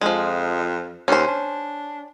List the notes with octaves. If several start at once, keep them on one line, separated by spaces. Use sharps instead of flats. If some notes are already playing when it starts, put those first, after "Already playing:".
F2 F3 G#3
D#2 C#4 C5
D4